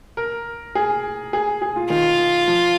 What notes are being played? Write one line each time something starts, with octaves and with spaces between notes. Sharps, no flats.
A#4
G#4
G#4
G#4
F4
D#3 F4
F3